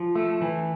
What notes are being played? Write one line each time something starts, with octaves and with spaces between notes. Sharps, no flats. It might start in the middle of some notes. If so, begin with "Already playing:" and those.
Already playing: F3
A3
E3